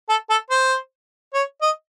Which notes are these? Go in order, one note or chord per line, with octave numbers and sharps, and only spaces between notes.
A4
A4
C5
C#5
D#5